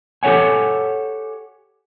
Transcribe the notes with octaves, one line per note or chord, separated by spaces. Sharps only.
G4 A4 C5 C#5 F#5 G#5